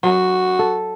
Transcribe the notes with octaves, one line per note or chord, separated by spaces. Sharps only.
F#3 F#4
A4